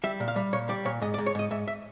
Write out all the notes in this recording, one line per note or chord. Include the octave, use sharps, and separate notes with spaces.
G3 E5
A#2
F5
G3
A#2 C#5
G3 D5
A#2 C#5
G#2 D#5
D5
G#2
C#5
G#2 D#5
G#2 E5
E5